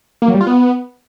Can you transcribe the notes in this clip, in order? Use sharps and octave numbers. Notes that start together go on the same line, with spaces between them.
A#3
F#3
G3
F4
B3